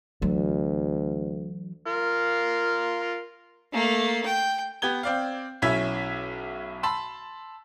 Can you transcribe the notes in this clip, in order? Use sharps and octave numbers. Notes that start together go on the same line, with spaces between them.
D2 E3 F#3
F4 A#4
A3 A#3
G5
B3 G4 G#6 G7
C4 D5 F5
B1 C#4 E4 E5 G#6 B6
A5 B5 C6 E6